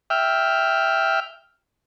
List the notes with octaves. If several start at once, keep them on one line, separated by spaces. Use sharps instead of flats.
E5 G5 F6